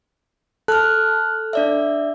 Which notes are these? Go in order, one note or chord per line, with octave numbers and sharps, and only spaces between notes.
A4 F6 F#6
D4 D5 E5